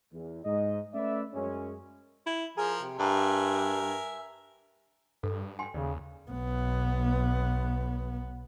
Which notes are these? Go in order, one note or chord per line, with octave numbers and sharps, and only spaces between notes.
E2
G#2 D#5
A3 C#4 B4 D5 E5
F#2 G#3 C#4
E4
F3 G#4 A#4
C3
G2 A#4 E5 G#5
G2 A4
G5 G#5 C6
D#2 C#3 D5
B1 B3